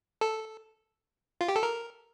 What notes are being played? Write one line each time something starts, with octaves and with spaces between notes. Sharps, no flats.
A4
F4
G4
A4
A#4